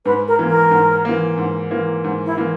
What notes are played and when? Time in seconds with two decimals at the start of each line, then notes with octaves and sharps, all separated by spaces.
0.05 G#2 B4
0.28 A#4
0.39 E3 A#3
0.50 A#4
0.71 G#2
1.05 E3 A#3
1.37 G#2
1.71 E3 A#3
2.04 G#2
2.26 E4
2.37 E3 A#3